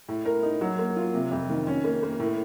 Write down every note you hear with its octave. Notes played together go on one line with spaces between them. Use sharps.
A2
A#4
D#4
F#3
A#3
F4
C3
F2
D#3
C#4
A#3
A#3
A2